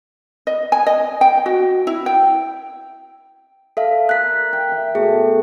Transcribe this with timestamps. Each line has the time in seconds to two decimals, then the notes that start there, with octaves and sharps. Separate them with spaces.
0.47 D#5
0.72 G#5
0.86 D#5
1.21 G5
1.46 F#4
1.87 E4
2.06 G5
3.77 A4 E5 F5
4.09 A#4 D5 G#5 F#6 B6
4.53 G5
4.72 E5
4.95 B2 A3 G#4